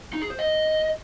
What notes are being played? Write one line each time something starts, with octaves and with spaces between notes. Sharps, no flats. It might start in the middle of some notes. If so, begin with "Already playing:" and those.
D#4
G#4
C5
D#5